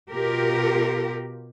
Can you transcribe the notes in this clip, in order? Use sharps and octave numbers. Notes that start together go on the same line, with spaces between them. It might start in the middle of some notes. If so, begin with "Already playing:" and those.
B2 F4 G4 A#4